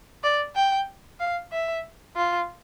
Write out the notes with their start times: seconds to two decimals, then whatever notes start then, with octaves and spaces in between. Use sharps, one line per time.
0.24 D5
0.56 G5
1.20 F5
1.52 E5
2.16 F4